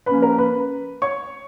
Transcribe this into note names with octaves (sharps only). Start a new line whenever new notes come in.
F3 A#3 C#4 B4 B5
A#4 A#5
B4 B5
C#5 C#6